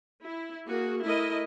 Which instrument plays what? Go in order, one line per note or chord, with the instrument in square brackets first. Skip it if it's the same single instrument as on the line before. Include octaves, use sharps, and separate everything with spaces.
[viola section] E4
A#3 F#4 G#4
A3 E4 A#4 D#5